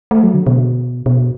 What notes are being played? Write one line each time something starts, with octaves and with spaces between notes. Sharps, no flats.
A3
F#3
D3
B2
B2